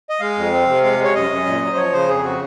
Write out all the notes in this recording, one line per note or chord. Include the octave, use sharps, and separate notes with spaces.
D#5
G#3 F5
F2
C4
C3
G#3 F5
G#3
C#5
F#2 D#5
F#2
A#2
F#3
C5
F3 C#5
C#3 C5
F2 G#4
C#3 F#4